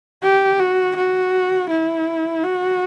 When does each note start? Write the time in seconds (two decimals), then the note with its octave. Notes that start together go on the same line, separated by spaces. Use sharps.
0.23 G4
0.60 F#4
0.96 F#4
1.70 E4
2.44 F#4